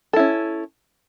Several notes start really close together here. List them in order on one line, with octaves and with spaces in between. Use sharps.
A4 E4 C#4